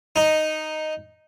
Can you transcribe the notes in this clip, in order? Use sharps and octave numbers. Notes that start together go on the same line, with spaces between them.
D#4